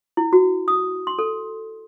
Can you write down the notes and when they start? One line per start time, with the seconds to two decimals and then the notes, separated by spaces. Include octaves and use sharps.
0.17 E4
0.33 F#4
0.68 D#6
1.07 C6
1.19 A4